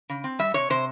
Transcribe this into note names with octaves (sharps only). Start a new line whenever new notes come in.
C#3
C4
G3 E5
C3 C#5
C3 C5